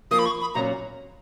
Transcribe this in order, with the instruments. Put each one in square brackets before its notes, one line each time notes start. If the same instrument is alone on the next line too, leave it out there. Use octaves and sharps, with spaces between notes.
[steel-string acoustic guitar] F3 A#3 F4 [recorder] D#6
[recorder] B5
C#6
B5
[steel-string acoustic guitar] A#2 F#3 C#4 [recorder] A#5